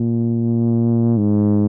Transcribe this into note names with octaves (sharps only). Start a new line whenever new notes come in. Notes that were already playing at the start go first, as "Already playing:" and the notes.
Already playing: A#2
G#2